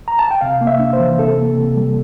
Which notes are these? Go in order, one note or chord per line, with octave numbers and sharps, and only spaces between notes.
A#5
A5
G5
C3 F5
A#3
E5
D4
C5
E3
C3 A4
A#3
C3
G3